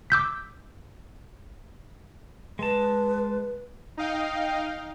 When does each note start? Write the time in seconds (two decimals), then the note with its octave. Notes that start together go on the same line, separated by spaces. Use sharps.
0.10 D6 E6 G6 B6
2.59 G#3 B4 A5
3.97 D#4 D#5 F5 G5